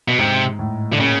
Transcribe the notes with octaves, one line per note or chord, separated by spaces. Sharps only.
B2
G#2 C3
A2
D3
A#2 C#3